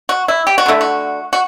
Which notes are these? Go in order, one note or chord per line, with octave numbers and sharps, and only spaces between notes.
F#4
E4
G4
F#4
D3 A3 E4
F#4
F#4